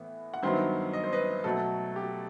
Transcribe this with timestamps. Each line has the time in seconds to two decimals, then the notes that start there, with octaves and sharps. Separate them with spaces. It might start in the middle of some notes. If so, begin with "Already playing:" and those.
Already playing: A2 E3 B3
0.34 F#5
0.43 G2 D#3 F#3 B3 C5 E5
0.93 D#5
1.04 C5
1.13 B4 D#5
1.44 B2 F#3 A3 A4
1.96 G4